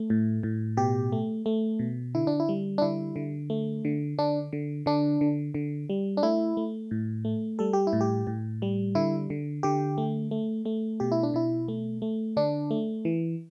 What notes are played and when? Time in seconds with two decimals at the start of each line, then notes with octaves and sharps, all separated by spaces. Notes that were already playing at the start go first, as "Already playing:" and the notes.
Already playing: A3
0.10 A2
0.43 A2
0.77 B2 G4
1.12 A3
1.46 A3
1.79 B2
2.15 D3 E4
2.27 D4
2.40 E4
2.49 G3
2.78 D4
2.82 D3 E4
3.16 D3
3.50 A3
3.85 D3
4.18 D3 D4
4.53 D3
4.86 D3 D4
5.21 D3
5.54 D3
5.90 G3
6.17 D4
6.23 A3 E4
6.57 A3
6.91 A2
7.25 A3
7.59 G3 A4
7.73 G4
7.87 E4
7.93 A2
8.01 G4
8.27 A2
8.62 G3
8.95 D3 E4
9.30 D3
9.63 D3 G4
9.98 A3
10.31 A3
10.65 A3
11.00 B2 G4
11.12 E4
11.23 D4
11.34 B2 E4
11.68 A3
12.02 A3
12.37 D3 D4
12.71 A3
13.05 E3